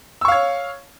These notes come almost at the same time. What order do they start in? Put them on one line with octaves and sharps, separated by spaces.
E6 C#6 F5 C#5